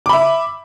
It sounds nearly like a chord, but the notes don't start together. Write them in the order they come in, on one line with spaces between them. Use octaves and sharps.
D6 B5 E5